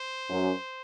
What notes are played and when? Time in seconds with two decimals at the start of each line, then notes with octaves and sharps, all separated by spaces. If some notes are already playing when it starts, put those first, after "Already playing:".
Already playing: C5
0.29 F#2